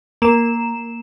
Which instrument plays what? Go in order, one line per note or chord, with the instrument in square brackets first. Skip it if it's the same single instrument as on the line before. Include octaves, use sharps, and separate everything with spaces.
[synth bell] A#3 E7